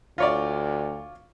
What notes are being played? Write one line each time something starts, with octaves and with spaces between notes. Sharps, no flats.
D2 F4 C#5 D5